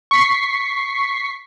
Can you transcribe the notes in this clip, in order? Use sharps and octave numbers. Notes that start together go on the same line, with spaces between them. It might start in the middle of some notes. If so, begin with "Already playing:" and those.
C#6 B6 C7